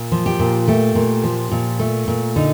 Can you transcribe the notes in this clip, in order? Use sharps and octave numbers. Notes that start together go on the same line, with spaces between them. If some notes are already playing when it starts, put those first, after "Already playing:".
Already playing: A#2
F3
G4
A#2
A3 G4
A#2
F3
A#2
A3
A#2
D3 D#4